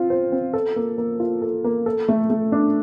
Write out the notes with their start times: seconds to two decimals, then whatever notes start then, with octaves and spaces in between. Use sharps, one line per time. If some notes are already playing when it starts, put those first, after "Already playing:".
Already playing: C4 F4
0.10 C5
0.32 C4
0.54 A4
0.76 A#3
0.98 A#3
1.20 F4
1.42 A4
1.64 A#3
1.86 A4
2.08 A3
2.30 A3
2.52 D4